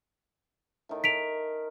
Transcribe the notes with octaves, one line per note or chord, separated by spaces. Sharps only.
A2 D#3
A#4 B6 D7 F7